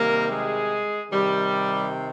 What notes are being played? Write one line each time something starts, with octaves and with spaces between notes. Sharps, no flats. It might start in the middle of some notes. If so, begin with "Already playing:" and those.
Already playing: C3 D#3 G3 A#3 A#4
G#3 G#4
C3 D#3 G3